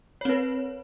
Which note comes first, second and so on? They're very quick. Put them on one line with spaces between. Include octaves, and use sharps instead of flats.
C#5 C4 B4